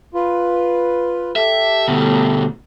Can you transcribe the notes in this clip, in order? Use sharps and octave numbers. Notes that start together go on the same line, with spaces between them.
F4 B4
G4 A4 E5
D2 B2